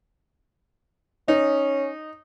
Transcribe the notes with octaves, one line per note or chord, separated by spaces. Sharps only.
C#4 D#4